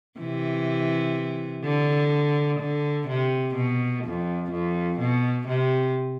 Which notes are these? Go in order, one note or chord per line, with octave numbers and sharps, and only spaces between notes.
C3 E3
D3
D3
C3
B2
F2
F2
B2
C3